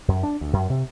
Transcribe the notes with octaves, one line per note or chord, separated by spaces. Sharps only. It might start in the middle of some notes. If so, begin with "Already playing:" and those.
F#2
D4
D2
F#2
C3